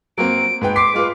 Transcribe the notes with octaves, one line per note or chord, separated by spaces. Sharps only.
F#3 A#3 C4 D7
G#2 B4 G5
C6 D6 B6 C7
G#3 F4 B4